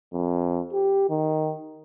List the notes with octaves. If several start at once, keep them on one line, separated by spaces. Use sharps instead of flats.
F2
G4
D#3